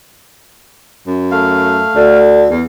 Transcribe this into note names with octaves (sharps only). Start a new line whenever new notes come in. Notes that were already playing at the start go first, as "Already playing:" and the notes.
F#2
A3 F5
D2 D3
E2